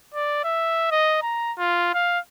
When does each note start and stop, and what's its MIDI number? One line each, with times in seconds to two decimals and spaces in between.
0.14 0.44 74
0.44 0.87 76
0.91 1.19 75
1.22 1.53 82
1.58 1.90 65
1.94 2.19 77